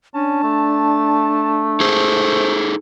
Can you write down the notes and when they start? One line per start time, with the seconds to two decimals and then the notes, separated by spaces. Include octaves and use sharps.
0.14 C#4 D4 A5
0.43 A3
1.80 D#4 G#4 A4 C5